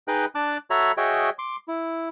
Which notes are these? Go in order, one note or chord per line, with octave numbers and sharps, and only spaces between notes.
D#4 G#4 B4 D#5 G5 F#6
D4 A5 D6 F#6
F#4 A4 C#5 E5 A#5 B5
F#4 G#4 C#5 D#5 E5 G5
C6 D6
E4